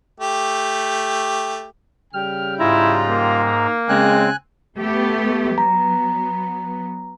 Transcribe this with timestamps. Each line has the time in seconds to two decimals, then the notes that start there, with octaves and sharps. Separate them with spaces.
0.20 A3 G4
2.13 C#3 G3 G5 F6
2.60 G#2 E4 F4 A#5
3.10 A#3
3.89 C#3 G#3 C4 G#5 F#6
4.77 A3 B3 G4
5.58 F#3 B3 A#5